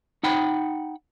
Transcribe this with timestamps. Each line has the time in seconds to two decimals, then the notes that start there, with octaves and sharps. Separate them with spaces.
0.23 D#4 F#5 G5 B5